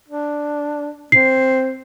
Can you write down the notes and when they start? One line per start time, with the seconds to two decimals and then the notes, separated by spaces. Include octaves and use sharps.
0.09 D4
1.12 C4 C7